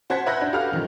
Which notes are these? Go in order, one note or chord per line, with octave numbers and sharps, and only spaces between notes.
F#4 C5 F#5 A5 G#6 B6
B4 E5 F#5 F#6 G6 A#6
D4
F#4 G4 A4 B4 F5 F6
F#2 D#3 F3